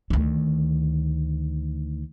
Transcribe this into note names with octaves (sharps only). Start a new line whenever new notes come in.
D2 D#3